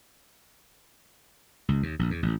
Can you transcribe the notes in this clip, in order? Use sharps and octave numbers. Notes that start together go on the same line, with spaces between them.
C#2
D#2
A#1
E2
A1